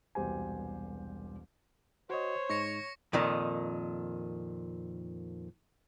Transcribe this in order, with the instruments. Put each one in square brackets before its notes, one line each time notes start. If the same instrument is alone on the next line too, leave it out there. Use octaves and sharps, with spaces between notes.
[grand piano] E1 C2 B2 G4 C5 G#5
[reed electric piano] F#4 D#5 [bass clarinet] C5 [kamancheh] C#5
[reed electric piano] G#2 G#3 D#4 [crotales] C#6 A#6 C#7
[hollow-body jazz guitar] F2 A#2 D#3